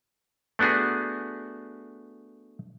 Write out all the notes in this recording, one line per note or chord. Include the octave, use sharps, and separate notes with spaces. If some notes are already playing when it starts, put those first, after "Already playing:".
A3 B3 D4 F#4 G#4